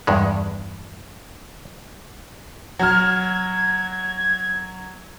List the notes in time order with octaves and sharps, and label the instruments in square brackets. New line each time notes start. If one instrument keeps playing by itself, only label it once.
[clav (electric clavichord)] E2 G2 G#3
[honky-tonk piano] F#3 F6 [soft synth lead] G#6